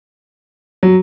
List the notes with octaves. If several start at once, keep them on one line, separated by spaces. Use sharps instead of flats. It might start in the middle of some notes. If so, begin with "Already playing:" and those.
F#3